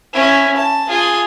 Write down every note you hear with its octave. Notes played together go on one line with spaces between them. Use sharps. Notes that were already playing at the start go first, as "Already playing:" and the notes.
C#4 E4
A5
F4 G#4